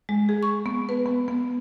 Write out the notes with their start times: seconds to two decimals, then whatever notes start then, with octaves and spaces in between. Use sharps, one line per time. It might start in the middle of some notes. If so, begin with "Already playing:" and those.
0.09 G#3
0.29 G#4
0.43 C#6
0.66 B3
0.89 B4
1.06 B3
1.28 B3